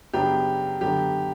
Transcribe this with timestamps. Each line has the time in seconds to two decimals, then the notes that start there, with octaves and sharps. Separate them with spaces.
0.13 F#2 C#3 F#3 B3 D4 G4
0.81 F#2 D3 F#3 B3 D4 G4